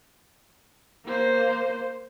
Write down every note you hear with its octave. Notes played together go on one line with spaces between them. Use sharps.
A#3 C5